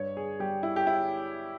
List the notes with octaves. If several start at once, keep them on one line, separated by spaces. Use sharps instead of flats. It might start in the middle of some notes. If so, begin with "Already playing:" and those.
Already playing: G2 C#5
G#4
G3 G4
E4
G4
E4